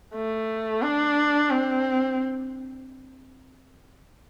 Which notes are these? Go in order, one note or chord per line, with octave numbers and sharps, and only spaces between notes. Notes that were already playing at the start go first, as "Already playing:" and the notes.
A3
D4
C4